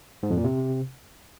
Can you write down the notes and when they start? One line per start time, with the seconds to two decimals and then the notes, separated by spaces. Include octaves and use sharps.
0.23 G#2
0.30 F2
0.37 A#2
0.44 C3